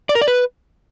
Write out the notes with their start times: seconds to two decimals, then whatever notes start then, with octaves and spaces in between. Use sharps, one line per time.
0.09 D5
0.15 A#4
0.21 D5
0.28 B4